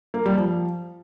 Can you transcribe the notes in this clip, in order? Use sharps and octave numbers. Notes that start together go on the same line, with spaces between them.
A#3
G3
F3